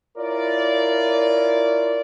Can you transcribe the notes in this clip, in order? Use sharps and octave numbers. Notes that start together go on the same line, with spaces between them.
E4 F4 A#4 C#5 D5